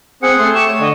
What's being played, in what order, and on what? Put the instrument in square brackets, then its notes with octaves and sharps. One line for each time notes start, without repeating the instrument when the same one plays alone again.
[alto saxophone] C4 [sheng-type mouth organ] G#4 F#5 [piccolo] C#7
[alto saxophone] A3 [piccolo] C6
[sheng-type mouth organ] G4 C#6 [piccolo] E7
[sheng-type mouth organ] C#5
[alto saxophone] D3 [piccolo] D#5